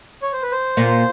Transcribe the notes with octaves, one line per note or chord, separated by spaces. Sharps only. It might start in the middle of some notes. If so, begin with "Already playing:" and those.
C#5
C5
B4
C5
A#2